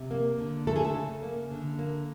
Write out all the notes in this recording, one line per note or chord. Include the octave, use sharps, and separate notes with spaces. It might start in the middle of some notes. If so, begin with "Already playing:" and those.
Already playing: C3
A#3
D3
A3 A4
G#4
A4
C#3
A#3
D3
A#3